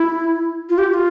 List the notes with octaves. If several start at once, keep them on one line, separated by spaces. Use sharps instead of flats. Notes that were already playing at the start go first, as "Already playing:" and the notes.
Already playing: E4
F4
G4
G4
F4